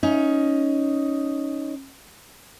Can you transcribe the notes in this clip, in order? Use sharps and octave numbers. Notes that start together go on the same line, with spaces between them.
C#4 D#4